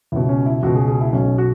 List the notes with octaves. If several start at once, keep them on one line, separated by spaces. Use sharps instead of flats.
C#2 B2 E4
C#4
E4
C#2 B2 F#4
G#4
G#4
E4
B1 B2 C#4
F#4